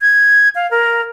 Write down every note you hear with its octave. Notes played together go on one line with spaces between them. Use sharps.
G#6
F5
A#4